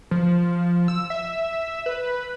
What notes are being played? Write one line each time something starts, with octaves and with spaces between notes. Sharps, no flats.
F3
E6
E5
B4